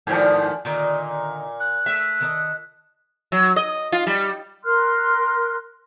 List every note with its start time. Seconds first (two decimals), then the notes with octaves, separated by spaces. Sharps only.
0.07 G#2 D#3 F3 D5 G#5
0.65 A#2 D3 D#3 D#4
1.60 F#6
1.86 A3 E5
2.21 D#3 A4 D#5
3.32 F#3
3.56 D#5
3.92 F4
4.07 G3
4.64 A#4 C6 F6 F#6